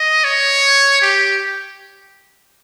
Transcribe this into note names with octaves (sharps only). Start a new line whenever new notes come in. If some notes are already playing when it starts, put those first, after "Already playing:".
Already playing: D#5
C#5
G4